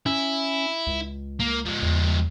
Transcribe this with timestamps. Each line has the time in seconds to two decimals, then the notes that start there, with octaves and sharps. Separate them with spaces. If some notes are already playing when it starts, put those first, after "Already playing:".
0.06 C#4 E4
0.87 C#2
1.40 A#3
1.66 F3 G#3
1.82 E2